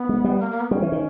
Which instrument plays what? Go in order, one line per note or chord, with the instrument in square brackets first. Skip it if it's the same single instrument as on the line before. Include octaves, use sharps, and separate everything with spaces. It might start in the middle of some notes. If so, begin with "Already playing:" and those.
Already playing: [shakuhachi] B3
[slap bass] G#3
G3
[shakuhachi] A#3
A#3
B3
[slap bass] G3 [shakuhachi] C#4
[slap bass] E3
D#3